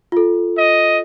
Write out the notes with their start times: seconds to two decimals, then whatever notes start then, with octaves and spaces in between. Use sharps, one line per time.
0.12 F4 A4
0.58 D#5